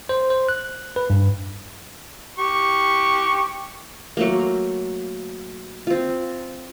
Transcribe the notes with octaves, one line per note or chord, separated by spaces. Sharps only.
C5
C5
F#6
B4
G2
G4 C#6
F#3 A3 A#3
C4 F4